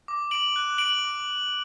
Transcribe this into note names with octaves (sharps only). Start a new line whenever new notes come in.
D6
D7 F#7
F#6
D7 F#7
D6